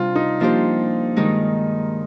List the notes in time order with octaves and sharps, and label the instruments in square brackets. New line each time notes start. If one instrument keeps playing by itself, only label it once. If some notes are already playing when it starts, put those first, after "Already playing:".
Already playing: [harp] C3 G3 D4 [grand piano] F4
[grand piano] D#4
[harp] F3 A#3 D4 G4 C5 [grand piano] F4
[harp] G2 D#3 G#3 D#4